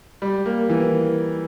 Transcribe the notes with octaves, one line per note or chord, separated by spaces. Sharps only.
G3
A#3
E3